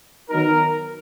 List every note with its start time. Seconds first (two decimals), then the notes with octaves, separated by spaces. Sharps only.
0.30 D#3 F#3 B3 D#4 A#4